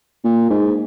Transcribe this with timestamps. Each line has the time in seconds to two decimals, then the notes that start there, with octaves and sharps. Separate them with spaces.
0.24 A#2
0.50 G#2